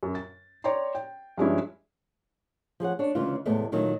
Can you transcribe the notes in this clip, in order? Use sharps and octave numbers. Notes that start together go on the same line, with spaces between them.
F#2
A6
C#5 D5 G5 A#5 C6
G5
G2 F3 G#3 C#4 D4 E4
F3 G#4 C#5 F#5
D4 C#5
D2 C#3 E3 G#3 F4
E2 A2 C3 G#3 A3 B3
A#2 D#3 F#3 A3 A#3